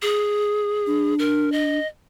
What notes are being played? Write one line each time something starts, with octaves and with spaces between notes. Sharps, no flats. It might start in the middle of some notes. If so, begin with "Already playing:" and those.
G#4
D4
A#4
D#5